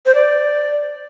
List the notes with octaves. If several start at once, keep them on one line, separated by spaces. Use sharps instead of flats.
C5
D5